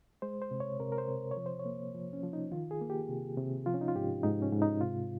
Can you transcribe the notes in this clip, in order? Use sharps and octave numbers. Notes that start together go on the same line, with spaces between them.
G#3 C5
C5
C3
C#5
C3 A#4
A#4
C5
C3
C#5
F3
C5
C#5
A#3
F3
C#4
F3
D#4
D#3 F4
G#4
A#3
G4
C3
C3
F3 F4
C#4
D#4
F4
G#2 G4
G#2 D#4
C#4
G#2
D#4
C3 F4